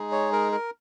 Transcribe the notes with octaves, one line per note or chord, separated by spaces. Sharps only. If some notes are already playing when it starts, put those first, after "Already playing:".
Already playing: G#3 D#4 G#4
C#5
A#4
A#4